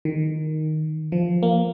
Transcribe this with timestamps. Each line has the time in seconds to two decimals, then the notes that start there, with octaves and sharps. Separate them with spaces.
0.05 D#3
1.12 F3
1.43 A#3